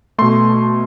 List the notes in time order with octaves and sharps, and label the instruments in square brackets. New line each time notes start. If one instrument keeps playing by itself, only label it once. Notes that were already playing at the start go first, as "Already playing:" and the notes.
[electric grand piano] B2 A3 C6